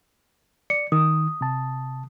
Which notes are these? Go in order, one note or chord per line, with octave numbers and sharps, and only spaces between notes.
D5 C#7
D#3 D#6
C3 A5